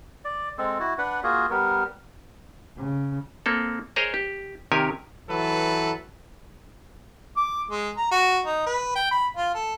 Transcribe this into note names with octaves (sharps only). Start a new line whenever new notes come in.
D5
G#3 C4 A4
E4 F#4
D4 B4 F#5
A#3 F4 F#4 G#4
G3 B3 A#4
C#3
A#3 C4 A4
G#4 A#4 C5 C#5 D#5 A#5
G4
C3 D#3 G4 A#4 C#5 G#5
E3 F#3 A4 B4
D6
G#3
A#5
F#4
D#4
B4
G5
B5
F4
A4